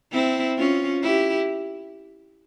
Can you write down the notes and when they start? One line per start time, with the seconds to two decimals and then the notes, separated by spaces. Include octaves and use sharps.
0.12 C4 E4
0.58 C#4 F4
1.03 E4 G4